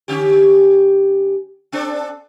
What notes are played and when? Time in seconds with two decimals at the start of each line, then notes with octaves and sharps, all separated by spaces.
0.08 D3 C#4 G4
1.72 C4 D4 A4